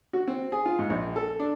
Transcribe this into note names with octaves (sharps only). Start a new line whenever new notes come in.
F#4
C4
G#4
F4
G#2
A#1
A4
D4